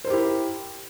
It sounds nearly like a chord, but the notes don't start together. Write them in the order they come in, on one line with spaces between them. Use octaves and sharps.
C5 A#4 G4 E4